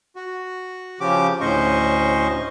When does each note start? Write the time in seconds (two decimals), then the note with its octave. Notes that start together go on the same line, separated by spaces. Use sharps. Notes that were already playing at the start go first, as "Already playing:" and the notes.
0.16 F#4
1.01 C#3 F3 C#4 G4 D6
1.41 D2 A2 C#4 C5 D#5 C#6